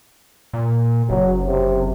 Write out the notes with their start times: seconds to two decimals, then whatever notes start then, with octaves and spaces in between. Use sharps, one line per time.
0.53 A#2
1.10 F#1 F#3
1.47 C3